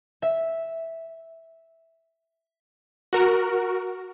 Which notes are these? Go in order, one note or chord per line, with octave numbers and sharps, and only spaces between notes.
E5
F#4 A#4